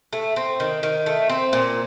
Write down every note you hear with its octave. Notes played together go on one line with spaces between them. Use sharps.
A3
C4
D#3
D#3
A3
C4
A#2